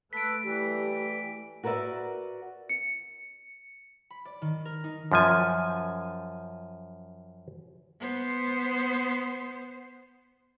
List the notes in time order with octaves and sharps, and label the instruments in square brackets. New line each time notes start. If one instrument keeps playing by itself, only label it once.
[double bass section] A3 [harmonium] A4 B4 [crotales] B6 D7
[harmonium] E3 G3 [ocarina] G4
[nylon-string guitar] F#4 A#4 B4 D5 E5
[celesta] C#7
[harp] B5
D5
D#3
A#4
D#4
[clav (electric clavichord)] F#2 F3 G#5
[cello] B3 C5